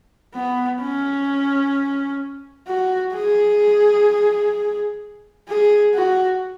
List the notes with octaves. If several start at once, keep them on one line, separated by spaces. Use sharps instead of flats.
B3
C#4
F#4
G#4
G#4
F#4